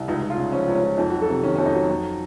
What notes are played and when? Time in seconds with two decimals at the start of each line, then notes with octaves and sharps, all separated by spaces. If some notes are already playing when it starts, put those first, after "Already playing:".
Already playing: C2
0.08 C#2 D#4
0.23 C#2
0.30 F4
0.37 C#3
0.52 F3 C#4
0.67 C#2
0.75 C#4
0.83 C#2
0.98 F2 D#4
1.10 F#3 F#4
1.21 A4
1.29 C3
1.43 D#3 C#4
1.56 F2 C#4
1.66 D#4
1.74 F#3
1.89 F2